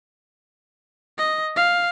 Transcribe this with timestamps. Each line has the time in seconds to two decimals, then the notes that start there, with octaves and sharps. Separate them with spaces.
1.18 D#5
1.56 F5